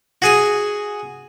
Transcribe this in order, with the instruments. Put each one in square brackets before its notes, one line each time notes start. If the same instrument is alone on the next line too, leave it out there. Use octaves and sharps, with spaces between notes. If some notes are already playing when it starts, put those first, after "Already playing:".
[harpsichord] F#4 G#4 G#5